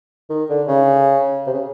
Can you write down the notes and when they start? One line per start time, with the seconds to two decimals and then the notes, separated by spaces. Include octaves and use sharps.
0.30 D#3
0.50 D3
0.68 C#3
1.47 C3
1.53 C#3